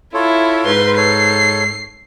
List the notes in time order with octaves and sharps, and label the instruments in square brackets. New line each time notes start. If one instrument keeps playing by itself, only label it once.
[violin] E4 [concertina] F4 A4 C#5
[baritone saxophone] G#2 [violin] B4 C6
[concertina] A4 C#5 [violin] C7